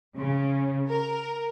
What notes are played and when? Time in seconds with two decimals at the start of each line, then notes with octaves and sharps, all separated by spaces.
0.16 C#3
0.88 A#4